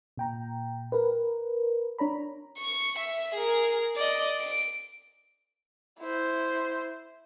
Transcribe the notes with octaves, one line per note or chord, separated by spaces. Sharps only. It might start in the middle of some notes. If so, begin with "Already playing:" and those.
A#2 G5 A#5
A#4 B4
D4 C#5 A#5 B5
C#6
E5
G#4 A#4
D5 D#5
D7
E4 C5